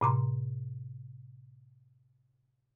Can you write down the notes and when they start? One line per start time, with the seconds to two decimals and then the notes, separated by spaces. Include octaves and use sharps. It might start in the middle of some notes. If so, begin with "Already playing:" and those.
0.01 A2 C3 A#5 C6